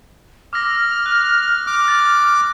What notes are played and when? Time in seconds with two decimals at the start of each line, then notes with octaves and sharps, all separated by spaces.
0.53 D6 E6 F6 A#6
1.06 F#6
1.67 D6
1.88 A6